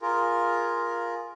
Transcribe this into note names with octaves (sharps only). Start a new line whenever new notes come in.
F4 G#4 A#4